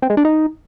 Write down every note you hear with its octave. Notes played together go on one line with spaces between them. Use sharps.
C4
G#3
D4
D#4